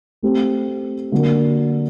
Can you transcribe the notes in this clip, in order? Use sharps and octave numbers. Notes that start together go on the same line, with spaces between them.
A3 C4 G4
D3 F#3 A#3 F#4 A#4